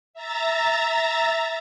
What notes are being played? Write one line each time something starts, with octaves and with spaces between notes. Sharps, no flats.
E5 A#5 A6